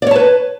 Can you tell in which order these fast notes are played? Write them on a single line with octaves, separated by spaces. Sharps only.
D5 C#5 A5 B4